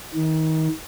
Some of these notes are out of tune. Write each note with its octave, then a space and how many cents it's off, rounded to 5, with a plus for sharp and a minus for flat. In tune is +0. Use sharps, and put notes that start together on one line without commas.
D#3 +30